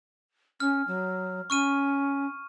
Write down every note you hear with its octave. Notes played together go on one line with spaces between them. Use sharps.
C#4 F6
F#3
C#4 C#6 F6 D#7